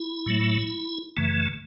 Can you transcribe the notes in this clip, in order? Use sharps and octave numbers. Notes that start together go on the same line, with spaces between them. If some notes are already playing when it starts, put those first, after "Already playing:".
Already playing: E4
A2 F#3 A3
F#2 C#3 E3 A3